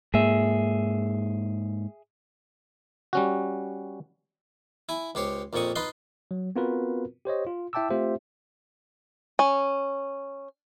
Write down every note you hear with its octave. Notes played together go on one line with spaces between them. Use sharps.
G#2 A#3 G#4 E5
G3 C#4 F#4
E4 G#5
C#2 G4 C5 C#5
A#1 F2 A#2 C4 C#6 D#6
D#4 F4 B4 D#5 C6
F#3
B3 C4 F4 F#4 A#4 B4
G4 C5 C#5 D#5
F4
E4 E5 G5 A5 D6 E6
A3 C4 F4 G4 C5 E5
C#4